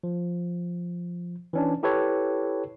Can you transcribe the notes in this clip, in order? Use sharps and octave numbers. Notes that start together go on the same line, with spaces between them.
F3
E3 C#4 D4
E4 G4 A4 B4 C#5